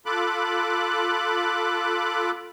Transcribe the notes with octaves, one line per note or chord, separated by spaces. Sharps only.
F4 A4 B5 D6 F#6